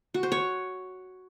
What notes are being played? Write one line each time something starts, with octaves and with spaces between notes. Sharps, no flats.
F#4
C5
C#5